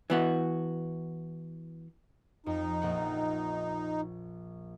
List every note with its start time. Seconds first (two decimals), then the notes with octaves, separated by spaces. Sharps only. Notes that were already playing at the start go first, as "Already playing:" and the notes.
0.10 E3 B3 F#4
2.46 F2 D#4
2.82 A#1 F#5